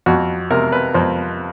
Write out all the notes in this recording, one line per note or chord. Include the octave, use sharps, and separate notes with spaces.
F2 F#4
C3 A#4
B4
F2 C5